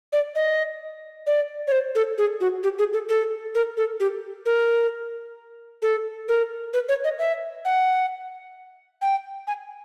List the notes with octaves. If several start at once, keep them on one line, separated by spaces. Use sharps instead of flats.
D5
D#5
D5
C#5
C5
A4
G#4
F#4
G4
G#4
A4
A4
A#4
A4
G4
A#4
A4
A#4
B4
C#5
D#5
E5
F#5
G5
G#5